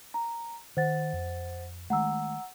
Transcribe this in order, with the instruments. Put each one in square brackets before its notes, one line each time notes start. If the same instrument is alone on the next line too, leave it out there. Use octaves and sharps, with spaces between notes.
[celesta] A#5
[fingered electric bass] D#3 [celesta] C5 F#5 A6
[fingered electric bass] F2
[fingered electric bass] D#3 G#3 A3 [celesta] F#5 A#5 E6